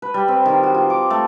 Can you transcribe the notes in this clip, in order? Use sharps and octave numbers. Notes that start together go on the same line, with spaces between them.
B4
G3
C4
D#3
F#4
F4
D6
A3